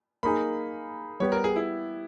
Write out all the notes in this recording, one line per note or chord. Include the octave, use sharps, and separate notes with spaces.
A#3 D#4 G#4 B5
G3 B3 G4 C#5
A#4
G#4
E4